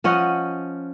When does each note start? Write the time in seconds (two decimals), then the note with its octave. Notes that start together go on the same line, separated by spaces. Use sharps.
0.04 F3 C#4 D#5 F#5